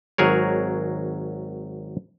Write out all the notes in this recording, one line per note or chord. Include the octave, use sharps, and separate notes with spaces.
G#1 F#3 G#4 A#4 C#5